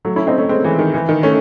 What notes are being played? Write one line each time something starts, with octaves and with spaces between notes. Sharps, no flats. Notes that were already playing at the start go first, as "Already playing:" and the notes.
F#3 A3
C#4 E4
C4 D#4
A3 C#4
G#3 C4
E3 G#3
D#3
E3
D#3
A3 C#4